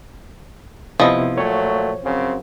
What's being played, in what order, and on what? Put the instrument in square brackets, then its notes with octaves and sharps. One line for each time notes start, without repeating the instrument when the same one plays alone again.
[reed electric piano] C3 B3 E4 [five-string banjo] F3 D#5
[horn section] A#2 F#3 A3 [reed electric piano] C#5
[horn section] F#2 C#3 C4